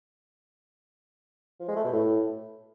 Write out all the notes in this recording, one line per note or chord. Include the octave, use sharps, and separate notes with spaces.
F3
G#3
A3
B2
A2